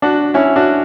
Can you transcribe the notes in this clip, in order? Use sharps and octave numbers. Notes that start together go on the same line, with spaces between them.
D4 F#4
C#4 E4
D4 F#4